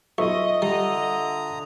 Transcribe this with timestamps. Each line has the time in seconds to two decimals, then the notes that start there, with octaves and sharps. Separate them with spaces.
0.18 B1 F4 D#5 E5 C#6
0.62 D3 G3 A#5 D#6